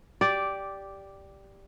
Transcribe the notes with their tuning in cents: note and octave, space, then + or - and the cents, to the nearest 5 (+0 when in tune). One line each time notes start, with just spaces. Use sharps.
G4 +0 D5 -5